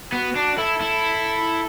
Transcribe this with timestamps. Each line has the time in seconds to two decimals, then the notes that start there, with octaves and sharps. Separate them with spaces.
0.12 B3 F#4
0.36 D4
0.57 E4 A4
0.81 E4